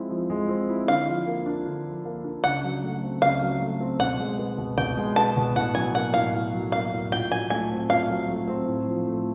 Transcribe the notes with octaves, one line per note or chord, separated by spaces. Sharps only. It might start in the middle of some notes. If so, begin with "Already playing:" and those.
Already playing: F3 G#3 C4 E4
F3
G#3
C4
E4
D3 F5
F3
A#3
D4
D3
F3
A#3
D4
C#3 F#5
F#3
A3
C4
C#3 F5
F#3
A3
C4
B2 F#5
G#3
B3
B2
B2 G5
G#3
B3 A5
B2
A2 F#5
F#3 G#5
A#3 F#5
A2 F5
A2
F#3
A#3 F5
A2
A#2 G5
F#3 G#5
A3 G#5
C4
A#2 F5
F#3
A3
C4
A2
F3
A3